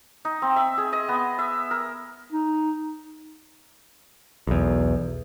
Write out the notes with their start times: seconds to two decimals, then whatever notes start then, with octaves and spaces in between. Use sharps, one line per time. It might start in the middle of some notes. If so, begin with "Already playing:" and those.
0.25 D#4
0.42 C4
0.56 E5
0.78 G#4
0.93 D#5
1.09 B3
1.39 E5
1.71 A#4
2.32 D#4
4.47 B1 E2